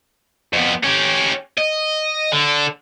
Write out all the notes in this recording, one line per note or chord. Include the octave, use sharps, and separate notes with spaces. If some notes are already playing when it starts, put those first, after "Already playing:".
F2 B3
C#4 G4
D#5
D3